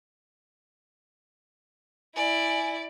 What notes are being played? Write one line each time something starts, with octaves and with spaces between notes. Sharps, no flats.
E4 D5 G#5